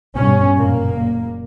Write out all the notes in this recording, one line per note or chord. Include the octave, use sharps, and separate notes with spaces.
G2 B2 C#4
F#1 A#2 A#3